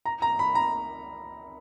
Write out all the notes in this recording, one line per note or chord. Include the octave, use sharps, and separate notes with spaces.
A#5
A#5
B5
A#5